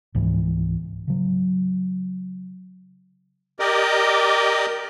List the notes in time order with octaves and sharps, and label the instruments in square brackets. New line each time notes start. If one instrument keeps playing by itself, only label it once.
[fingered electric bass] C#2 G#2 E3
C#3 F#3
[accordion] G4 A#4 D5 D#5